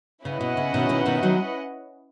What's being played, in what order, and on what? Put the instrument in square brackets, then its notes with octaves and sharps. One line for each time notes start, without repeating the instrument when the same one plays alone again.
[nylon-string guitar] C#3 [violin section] C#4 E4 B4 D#5 F#5
[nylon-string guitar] B2
C#3
B2 D#3
B2 D#3
B2 D#3
D#3 F#3